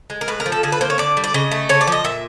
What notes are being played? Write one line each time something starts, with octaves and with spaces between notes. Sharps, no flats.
G#3
A#4
A2 B4
A#4
F3
A4
D3 G#4
B4
A#3 C5
C#5
D3 D5
G3
D5
C#3 D#5
A3
C#3 C#5
D5
F3 D#5
A#2 E5